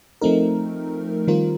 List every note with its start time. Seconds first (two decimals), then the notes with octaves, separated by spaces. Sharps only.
0.21 F3 A3 C4 D#4 A#4
1.27 D#3 G3 C4 F4 A#4